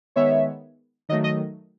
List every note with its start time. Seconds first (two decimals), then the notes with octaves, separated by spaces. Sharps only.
0.16 D#3 G#3 B3 C#5 E5
1.09 D#3 F#3 A3 D#5
1.24 D#5